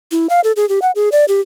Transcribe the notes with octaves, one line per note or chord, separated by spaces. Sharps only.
E4
F5
A4
G#4
G4
F#5
G#4
D5
G4